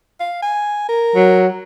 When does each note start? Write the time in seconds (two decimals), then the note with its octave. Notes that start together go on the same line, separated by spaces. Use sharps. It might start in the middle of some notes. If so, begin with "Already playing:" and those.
0.20 F5
0.43 G#5
0.89 A#4
1.16 F#3